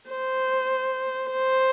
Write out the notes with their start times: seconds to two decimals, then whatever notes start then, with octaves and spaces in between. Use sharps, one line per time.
0.11 C5
1.30 C5